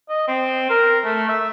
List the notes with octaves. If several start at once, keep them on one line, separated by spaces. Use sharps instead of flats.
D#5
C4
A#4
A3
E5